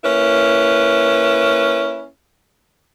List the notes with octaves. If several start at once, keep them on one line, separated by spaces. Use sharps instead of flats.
A#3 C#4 E4 B4